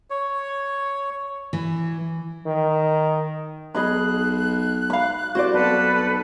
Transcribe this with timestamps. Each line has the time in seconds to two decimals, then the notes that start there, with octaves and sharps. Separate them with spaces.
0.10 C#5
1.53 E3
2.46 D#3
3.75 B1 G#4 D#5 B5 F#6
4.90 F5 B5
5.35 C2 F#4 C5 D5
5.54 B1 A4 B4 A5